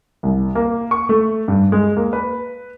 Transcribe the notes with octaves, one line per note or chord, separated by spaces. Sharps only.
C2
A#3
C#6
A3
G2
G#3
A#3
B4